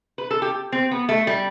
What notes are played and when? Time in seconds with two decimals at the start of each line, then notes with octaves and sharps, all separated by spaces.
0.18 B4
0.31 A4
0.42 G4
0.72 C4
0.91 B3
1.09 A3
1.27 G3